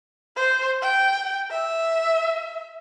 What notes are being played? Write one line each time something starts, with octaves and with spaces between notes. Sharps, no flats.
C5
G5
E5